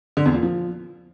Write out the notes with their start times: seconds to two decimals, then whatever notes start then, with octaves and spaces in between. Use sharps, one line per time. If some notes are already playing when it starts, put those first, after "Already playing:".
0.17 D3
0.26 E2
0.34 A#2
0.43 F3